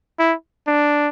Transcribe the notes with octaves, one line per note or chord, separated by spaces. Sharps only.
E4
D4